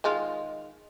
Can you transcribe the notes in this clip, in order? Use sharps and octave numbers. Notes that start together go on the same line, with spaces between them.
D#3 G#3 F4